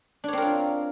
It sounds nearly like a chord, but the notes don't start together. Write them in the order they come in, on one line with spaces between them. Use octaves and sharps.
D4 C#5 C4 A#4 F4